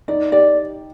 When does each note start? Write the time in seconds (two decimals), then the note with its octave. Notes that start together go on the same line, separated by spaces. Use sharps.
0.08 D#4 D5
0.32 G4 D5